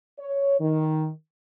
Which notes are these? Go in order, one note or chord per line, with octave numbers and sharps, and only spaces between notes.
C#5
D#3